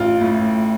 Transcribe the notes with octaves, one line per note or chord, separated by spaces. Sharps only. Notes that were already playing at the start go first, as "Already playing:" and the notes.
Already playing: A1 F4
A2